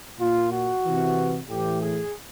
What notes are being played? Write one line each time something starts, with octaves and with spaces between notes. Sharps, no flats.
A#2 F4
F#4
C3 E3
A2 E3 G4
G#4